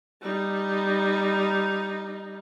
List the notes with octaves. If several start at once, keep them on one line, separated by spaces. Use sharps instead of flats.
G3 D#4